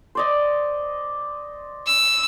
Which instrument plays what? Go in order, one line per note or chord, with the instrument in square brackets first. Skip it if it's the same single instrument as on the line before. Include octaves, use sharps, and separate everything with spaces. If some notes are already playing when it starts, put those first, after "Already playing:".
[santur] C5 D5 D#5
[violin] E6